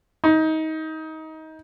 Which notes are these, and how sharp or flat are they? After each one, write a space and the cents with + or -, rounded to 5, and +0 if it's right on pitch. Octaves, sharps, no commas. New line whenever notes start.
D#4 +25